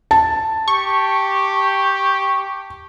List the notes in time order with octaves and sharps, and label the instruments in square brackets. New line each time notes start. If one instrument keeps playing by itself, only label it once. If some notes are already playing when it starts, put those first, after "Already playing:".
[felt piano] A5
[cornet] G4 [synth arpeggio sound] C#6